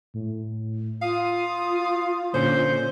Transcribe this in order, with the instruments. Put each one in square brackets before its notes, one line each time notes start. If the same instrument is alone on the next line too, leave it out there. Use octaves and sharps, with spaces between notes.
[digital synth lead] A2
[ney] F4 [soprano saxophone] F5 [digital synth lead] D#6
[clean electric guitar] A#2 D3 C#4 [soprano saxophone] C5 [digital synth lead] G6